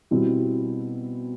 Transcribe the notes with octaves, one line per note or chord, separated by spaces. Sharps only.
B2 G3 C4 E4